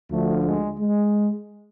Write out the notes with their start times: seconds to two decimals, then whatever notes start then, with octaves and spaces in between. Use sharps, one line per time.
0.10 D2 D3 F3 A3
0.44 G#3
0.79 G#3